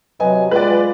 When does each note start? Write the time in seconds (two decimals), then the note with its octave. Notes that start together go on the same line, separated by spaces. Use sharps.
0.20 C3 F#3 B4 D#5 G#5
0.51 G#3 F4 B4 D5